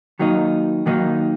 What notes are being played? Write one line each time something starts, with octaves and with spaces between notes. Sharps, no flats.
D#3 F#3 A#3 D#4
D#3 F#3 A#3 D#4